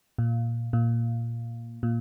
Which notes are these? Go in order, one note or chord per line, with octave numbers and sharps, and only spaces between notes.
A#2
A#2
A#2